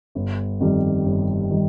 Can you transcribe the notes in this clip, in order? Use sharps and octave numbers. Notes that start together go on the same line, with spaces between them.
G1
F2 D#3 G3
G1
D#3 G3